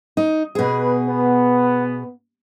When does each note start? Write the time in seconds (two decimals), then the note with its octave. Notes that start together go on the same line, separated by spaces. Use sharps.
0.17 D#4
0.55 B2 B3 G#4 B4
1.09 B3